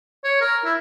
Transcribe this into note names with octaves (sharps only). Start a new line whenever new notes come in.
C#5
A#4
E4